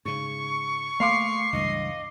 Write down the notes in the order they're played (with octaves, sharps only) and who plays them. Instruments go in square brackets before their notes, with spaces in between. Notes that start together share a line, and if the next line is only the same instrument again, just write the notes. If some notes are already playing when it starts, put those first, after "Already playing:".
[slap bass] G#2 C#3 [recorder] C#6
[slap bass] A3 A#3 [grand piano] F5 C6 D6 [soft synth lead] C7
[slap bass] C#2 G2 E3 [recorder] D#5